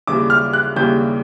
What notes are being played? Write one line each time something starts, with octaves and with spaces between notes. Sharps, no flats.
D#2 C#3 E3 G3 D6
F6
F#6
D#2 C#3 E3 G3 G6